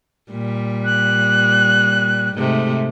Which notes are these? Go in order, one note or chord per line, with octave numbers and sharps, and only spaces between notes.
A#2 G3
F#6
G#2 C3 A3